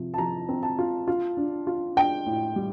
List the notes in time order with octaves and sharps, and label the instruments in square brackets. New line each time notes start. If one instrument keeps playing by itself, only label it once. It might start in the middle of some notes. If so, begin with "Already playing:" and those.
Already playing: [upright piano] C3 F3
A5
F3 A#5
C4
A5
F4
F4
D4
F4
D4 G5
A2
G3